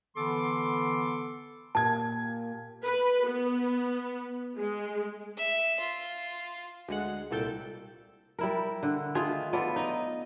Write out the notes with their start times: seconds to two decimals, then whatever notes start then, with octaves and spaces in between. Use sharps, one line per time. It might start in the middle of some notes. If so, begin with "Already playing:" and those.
0.16 D3 E3 B3 A4 C6 D6
1.75 A#2 G4 A5 G#6
2.84 B4
3.26 B3
4.57 G#3
5.37 E5
5.80 F4
6.88 D2 G#3 F#5
7.31 C2 A#2 A4 G5
8.39 G3 E4 A#4
8.83 D3
9.15 D#3 A3 F4 G#4
9.53 B3 F4 A4 D5
9.76 D#4 D#5